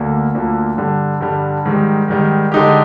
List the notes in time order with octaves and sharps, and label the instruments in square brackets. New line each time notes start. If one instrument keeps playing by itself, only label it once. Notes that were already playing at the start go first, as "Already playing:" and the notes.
Already playing: [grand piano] D2 D3 A#3
D2 D3 F3 A#3
G2 D3 G3
G2 D3 G3
G#2 D#3 G3
G#2 D#3 G3
D3 G#3 D#4 G4